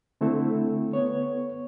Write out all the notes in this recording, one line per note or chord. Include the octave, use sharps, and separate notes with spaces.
D3 A3 C4 E4 A4
B3 C#5